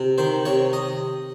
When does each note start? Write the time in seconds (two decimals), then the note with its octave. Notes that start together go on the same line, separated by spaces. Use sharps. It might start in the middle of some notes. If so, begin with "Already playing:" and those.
Already playing: C3
0.18 D#3 C5
0.45 C3 C#5
0.73 D#5